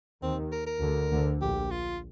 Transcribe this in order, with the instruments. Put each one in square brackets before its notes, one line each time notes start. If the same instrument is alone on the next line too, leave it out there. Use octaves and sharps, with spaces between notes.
[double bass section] D#2 D#3 [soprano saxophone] C4
[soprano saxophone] A#4
A#4
[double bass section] D2 D3
D2 D3
[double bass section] A#1 A#2 [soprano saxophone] G4
[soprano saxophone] F4